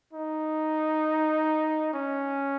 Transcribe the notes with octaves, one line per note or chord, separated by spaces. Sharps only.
D#4
C#4